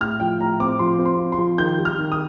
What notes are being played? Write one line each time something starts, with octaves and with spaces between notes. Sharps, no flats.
A2 F6
F3 G5
A2 A#5
C4 D6
F3 C6
C4
C6
F4
C6
F3
D#3 G6
G3
F6
D#3
D#6